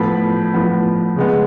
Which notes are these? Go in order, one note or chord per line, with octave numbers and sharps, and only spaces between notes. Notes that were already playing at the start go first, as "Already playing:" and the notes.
Already playing: A2 F3 B3 B5
A2 F3 B3
C#3 G#3 B3